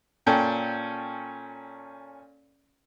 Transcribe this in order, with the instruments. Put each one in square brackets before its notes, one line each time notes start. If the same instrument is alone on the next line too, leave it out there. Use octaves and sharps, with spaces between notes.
[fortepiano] A#2 C#4 A4 G5